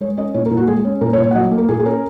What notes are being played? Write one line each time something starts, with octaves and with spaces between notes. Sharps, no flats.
G#3 C#5
C#4 D#5
A#2 C#5
A#4
A#2
F#4
G#3 G#4
C#4
A#2 A#4
C#5
A#2
C#5
F#5
F#3 D#5
A#3
A#4
A#2 G#4
G#4
C#4 A#4